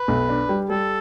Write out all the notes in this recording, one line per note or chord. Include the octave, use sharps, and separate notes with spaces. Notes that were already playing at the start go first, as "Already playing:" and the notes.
Already playing: B4
B1
D4
G3
G3 A4